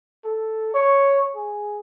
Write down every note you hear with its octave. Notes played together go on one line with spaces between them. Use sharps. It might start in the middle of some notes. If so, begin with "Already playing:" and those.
A4
C#5
G#4